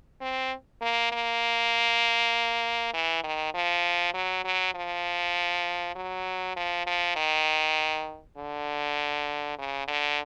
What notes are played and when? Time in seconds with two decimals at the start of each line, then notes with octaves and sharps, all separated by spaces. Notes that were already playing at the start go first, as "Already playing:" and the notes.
0.21 C4
0.82 A#3
1.12 A#3
2.94 E3
3.24 D#3
3.54 F3
4.14 F#3
4.45 F#3
4.74 F3
5.95 F#3
6.56 F3
6.87 F3
7.16 D#3
8.38 D3
9.58 C#3
9.88 D3